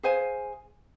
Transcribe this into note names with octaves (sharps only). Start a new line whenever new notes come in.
G#4 C5 F5 G#5